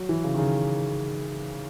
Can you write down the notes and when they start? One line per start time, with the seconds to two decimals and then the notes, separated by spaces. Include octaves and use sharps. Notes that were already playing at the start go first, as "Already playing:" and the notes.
Already playing: F#3
0.09 E3
0.24 C#3
0.34 D#3
0.38 C#3